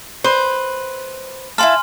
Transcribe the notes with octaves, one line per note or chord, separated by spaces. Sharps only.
B4 C5
E4 F5 G#5 A5 C6 F6